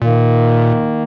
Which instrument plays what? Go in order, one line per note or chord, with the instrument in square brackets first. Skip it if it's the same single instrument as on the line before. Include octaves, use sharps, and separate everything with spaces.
[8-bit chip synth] A#2 [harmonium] D#3 A#3